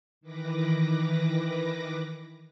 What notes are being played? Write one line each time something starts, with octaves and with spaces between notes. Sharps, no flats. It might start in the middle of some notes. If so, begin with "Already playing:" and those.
D#3 E3 B4 D6 A#6